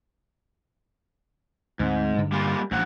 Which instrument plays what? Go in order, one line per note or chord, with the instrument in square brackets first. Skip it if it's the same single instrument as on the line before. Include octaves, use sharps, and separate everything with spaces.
[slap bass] D2 C4 [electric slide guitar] G#2
[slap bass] G2 D3
[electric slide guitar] G3 A#3 F4
[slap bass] A1 [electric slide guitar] G2 F3 F#5